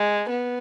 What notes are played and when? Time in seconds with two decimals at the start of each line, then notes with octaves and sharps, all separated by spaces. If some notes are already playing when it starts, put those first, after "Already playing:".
Already playing: G#3
0.30 B3